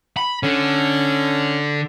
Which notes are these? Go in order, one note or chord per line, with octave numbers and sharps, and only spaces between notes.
B5
D3 C#4